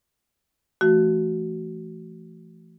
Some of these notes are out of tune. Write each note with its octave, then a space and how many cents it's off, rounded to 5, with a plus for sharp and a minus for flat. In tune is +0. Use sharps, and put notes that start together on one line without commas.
E3 +40 A3 +0 F#4 +15